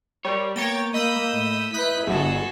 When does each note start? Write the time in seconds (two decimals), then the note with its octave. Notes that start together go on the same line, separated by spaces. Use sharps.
0.25 G3 A#4 C#5
0.56 A#3 B3 A#4 C#5 G5 A6
0.94 A#3 D#5 B5 D#6 E6 G6
1.30 A2
1.74 E4 B4 D#6 F#6 G6 B6
2.07 G1 F#4 G#4 A4